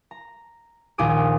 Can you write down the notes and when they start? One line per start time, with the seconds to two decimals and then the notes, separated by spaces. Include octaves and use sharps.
0.11 A#5
0.98 A#1 D#2 G#5 D6 D#6 D7